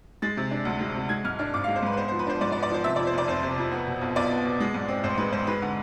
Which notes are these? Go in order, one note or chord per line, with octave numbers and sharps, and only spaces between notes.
G#3 A6
C3
D4
D2
G#3
C3
G#3 G#6
G#2 F6
D4 F6
G#1 D6
F5
G#3
C5
G#2 B4
B4
B3 C5
C5
F3
B4
D4 C5
G#2 D5
D5
B3
D5
F3 C5
C3 E5
D5
F2
C5
F1 D5
F1 C5
C3
F2
B3
B2
B1
B1 D5
B3
B2
G#3
G#2
C4
A1 C5
G#3 B4
G#2 C5
G#3 B4
D3